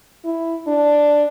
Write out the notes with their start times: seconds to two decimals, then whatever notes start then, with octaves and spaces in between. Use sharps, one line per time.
0.25 E4
0.67 D4